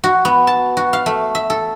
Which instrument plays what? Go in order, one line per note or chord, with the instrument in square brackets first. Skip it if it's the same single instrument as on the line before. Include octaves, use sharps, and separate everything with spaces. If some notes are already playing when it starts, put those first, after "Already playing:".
[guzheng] F#4
B3
A5
F#4
F5
A3
E5
A4